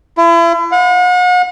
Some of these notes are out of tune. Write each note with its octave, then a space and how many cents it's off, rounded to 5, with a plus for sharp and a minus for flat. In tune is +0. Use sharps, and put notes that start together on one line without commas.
E4 +40
F#5 -40